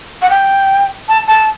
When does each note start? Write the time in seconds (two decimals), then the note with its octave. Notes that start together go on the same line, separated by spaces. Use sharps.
0.22 F#5
0.30 G5
1.09 A5
1.27 A5